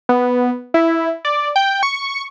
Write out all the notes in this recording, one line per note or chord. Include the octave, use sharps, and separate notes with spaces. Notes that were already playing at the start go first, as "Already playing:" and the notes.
B3
E4
D5
G5
C#6